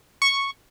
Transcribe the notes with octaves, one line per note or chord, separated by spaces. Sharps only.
C#6